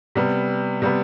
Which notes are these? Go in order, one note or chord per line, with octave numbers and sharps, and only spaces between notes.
C3 G3 B3
C3 G3 B3